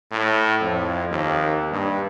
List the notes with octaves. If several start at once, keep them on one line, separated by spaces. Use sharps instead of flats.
A2
F2
D#2
G2